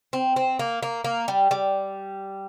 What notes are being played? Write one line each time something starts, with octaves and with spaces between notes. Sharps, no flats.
C4
C4
A#3
A#3
A#3
G3
G3